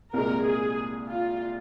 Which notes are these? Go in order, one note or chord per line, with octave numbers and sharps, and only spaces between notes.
C2 A#2 G#3 A#4
G#4
F4